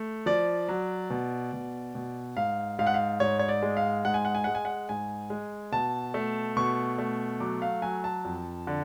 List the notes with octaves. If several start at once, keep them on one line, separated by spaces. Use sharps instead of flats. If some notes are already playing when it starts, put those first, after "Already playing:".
Already playing: A3
F3 D5
F#3
B2
B2
B2
G#2 F5
G#2 F5
F#5
F5
G#2 C#5
C#5
D5
G#3
F5
G#2 F#5
G#5
F#5
G#5
G#3 F#5
G#5
F#5
G#2 G#5
G#3
B2 A5
A3
B2 C#6
A3
F#3 D6
F5
F#3 G#5
A5
F2
D3